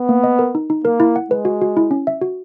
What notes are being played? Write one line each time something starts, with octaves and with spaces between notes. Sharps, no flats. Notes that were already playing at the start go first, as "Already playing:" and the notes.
Already playing: B3
A#3
D#5
A#4
D#4
D#4
A#3 A#4
E4
F#5
G#3 B4
F#4
F#4
E4
C#4
E5
F#4